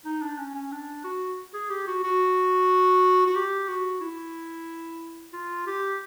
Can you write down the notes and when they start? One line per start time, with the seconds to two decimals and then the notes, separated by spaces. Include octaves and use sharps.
0.05 D#4
0.22 D4
0.38 C#4
0.55 C#4
0.72 D4
1.04 F#4
1.54 G#4
1.70 G4
1.87 F#4
2.04 F#4
3.27 F#4
3.36 G4
3.68 F#4
4.01 E4
5.33 F4
5.67 G4